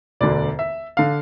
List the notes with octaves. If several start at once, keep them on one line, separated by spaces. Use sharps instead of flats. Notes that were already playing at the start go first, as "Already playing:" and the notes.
E1 D2 D3 D5
E5
D3 F5